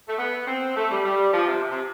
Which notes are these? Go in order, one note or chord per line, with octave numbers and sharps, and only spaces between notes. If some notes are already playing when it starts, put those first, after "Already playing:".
A3
B3
C4
A3
G3
G3
F3
C3
C3
C3